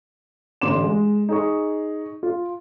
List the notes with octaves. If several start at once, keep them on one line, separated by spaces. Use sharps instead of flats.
A1 D3 C6 D6 E7
G#3
D#4 G#4 C#6
F4